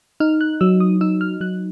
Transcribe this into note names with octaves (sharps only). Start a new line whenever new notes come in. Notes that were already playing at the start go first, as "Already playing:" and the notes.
D#4 F6
F#6
F#3 E6
D#6
D#4 E6
F6
F#3 F#6